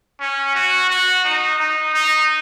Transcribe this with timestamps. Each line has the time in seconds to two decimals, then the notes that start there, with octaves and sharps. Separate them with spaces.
0.20 C#4
0.55 F#4
0.90 F#4
1.25 D#4
1.59 D#4
1.94 D#4